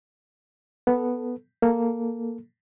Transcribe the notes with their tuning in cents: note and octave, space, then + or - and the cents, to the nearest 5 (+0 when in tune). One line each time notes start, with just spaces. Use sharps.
B3 +0 A4 +0
A#3 +0 A4 +0